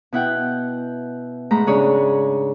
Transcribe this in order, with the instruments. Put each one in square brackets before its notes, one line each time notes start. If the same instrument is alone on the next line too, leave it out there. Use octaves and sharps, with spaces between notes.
[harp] B2 E4 F#5 G5
G#2 A3 A#5 B5
C#3 D4 G#4 C#5 D5